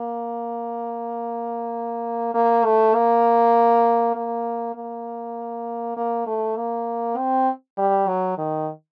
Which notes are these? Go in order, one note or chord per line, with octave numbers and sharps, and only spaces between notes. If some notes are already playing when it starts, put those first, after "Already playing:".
Already playing: A#3
A#3
A3
A#3
A#3
A#3
A#3
A3
A#3
C4
G3
F#3
D#3